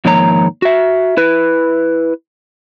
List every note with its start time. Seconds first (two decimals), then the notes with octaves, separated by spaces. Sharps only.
0.05 G#2 D#3 F3 A#3 C#5 A#5
0.62 F#4 E5
1.17 E4 B4